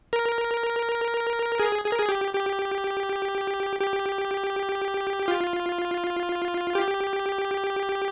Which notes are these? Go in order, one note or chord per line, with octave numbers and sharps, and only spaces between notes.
A#4
G#4
G#4
A#4
G#4
G4
G4
G4
F4
G4